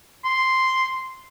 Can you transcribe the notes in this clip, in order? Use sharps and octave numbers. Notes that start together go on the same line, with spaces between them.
C6